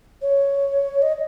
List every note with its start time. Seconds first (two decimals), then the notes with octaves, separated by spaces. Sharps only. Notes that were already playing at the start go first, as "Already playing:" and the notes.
0.22 C#5
1.02 D#5